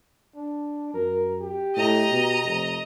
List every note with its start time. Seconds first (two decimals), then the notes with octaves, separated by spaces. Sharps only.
0.36 D4
0.94 F#2 A#4
1.40 G4
1.76 A2 D#5 A#5
2.10 B2
2.44 F1